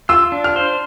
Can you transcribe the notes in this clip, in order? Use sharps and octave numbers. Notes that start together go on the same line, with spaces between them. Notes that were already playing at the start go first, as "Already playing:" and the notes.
F4 E6
D4
F6
C5